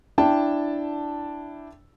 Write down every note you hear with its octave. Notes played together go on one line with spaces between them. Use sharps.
D4 E4 G5 A5